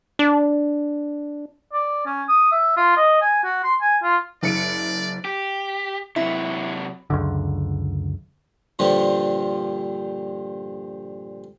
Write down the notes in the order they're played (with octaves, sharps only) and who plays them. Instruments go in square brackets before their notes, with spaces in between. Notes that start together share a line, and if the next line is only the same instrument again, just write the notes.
[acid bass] D4
[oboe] D5
C#4
D#6
E5
F4
D#5
G#5
F#4
C6
G#5
F4
[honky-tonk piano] F#1 C#7 D7 [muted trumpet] D5
[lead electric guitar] G4
[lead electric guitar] C3 F#3 [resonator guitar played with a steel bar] E4
[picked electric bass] C#2 F#2 D3
[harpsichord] G2 A#2 D3 F3 G3